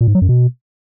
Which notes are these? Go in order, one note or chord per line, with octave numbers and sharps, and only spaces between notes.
A#2
G#2
F#3
F#2
B2